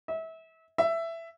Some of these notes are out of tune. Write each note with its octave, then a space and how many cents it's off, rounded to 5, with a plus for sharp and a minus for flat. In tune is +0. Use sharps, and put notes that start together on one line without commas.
E5 -30
E5 +10